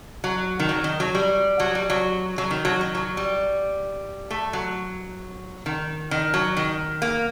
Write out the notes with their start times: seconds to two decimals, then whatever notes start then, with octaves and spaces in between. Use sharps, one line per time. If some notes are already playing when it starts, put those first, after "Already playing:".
0.24 F#3
0.60 D#3
0.69 F#3
0.84 D#3
1.00 F#3
1.15 G3
1.60 F#3
1.75 G3
1.90 F#3
2.38 F#3
2.51 D#3
2.65 F#3
2.81 D#3
2.95 F#3
3.17 G3
4.31 A3
4.53 F#3
5.66 D#3
6.11 D#3
6.34 F#3
6.57 D#3
7.02 A#3